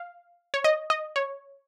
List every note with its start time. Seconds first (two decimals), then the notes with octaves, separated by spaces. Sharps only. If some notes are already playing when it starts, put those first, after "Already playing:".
Already playing: F5
0.54 C#5
0.64 D#5
0.90 D#5
1.16 C#5